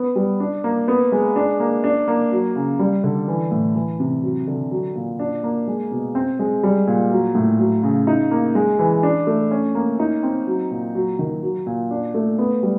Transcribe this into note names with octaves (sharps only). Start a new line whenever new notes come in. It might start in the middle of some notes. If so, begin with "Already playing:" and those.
Already playing: B3
G3
D4
A#3
B3
G#3
D4
A#3
D4
A#3
F#3
C#3
G3
D3
E3
A2
E3
C3
F#3
D3
F#3
A#2
D4
A#3
G#3
B2
C4
G#3
G3
A#2
F#3
A2
F#3
C#3
D#4
A#3
G#3
E3
D4
A3
C#4
A#3
D#4
C4
F#3
A#2
F#3
D#3
F#3
A#2
D4
A3
B3
G3